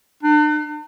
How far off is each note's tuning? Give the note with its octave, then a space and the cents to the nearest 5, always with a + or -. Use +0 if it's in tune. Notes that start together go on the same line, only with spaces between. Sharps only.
D4 +45